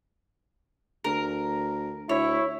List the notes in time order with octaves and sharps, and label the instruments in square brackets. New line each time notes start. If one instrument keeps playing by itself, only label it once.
[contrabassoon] D2 [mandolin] A#4
[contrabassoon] D2 [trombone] E4 [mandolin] C#5